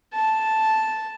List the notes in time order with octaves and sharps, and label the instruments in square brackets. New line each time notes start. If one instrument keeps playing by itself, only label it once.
[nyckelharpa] A5